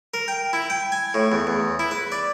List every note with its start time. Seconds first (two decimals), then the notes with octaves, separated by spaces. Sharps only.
0.14 A#4
0.28 G5
0.53 E4
0.70 G5
0.92 G#5
1.14 A2
1.32 E2
1.47 E2
1.79 E4
1.91 B4
2.12 D5